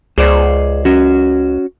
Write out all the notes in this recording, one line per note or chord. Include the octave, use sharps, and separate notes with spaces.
C#2 G#4 C5 D5
C#4 F#4